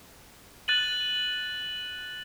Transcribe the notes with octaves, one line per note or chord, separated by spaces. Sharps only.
F#6 A6 D#7 F#7